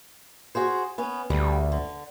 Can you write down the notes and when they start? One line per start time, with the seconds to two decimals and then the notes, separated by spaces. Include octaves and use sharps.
0.55 F#4 G#4 C5
0.98 B3 C#4
1.30 D2 G3
1.72 D3